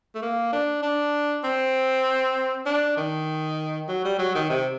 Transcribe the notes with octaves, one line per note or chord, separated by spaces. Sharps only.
A3
A#3
D4
D4
C4
D4
D#3
F#3
G3
F#3
D#3
C3